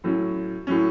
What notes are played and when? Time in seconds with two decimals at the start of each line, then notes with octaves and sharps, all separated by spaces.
0.04 A2 F#3 C#4
0.67 A2 F#3 C#4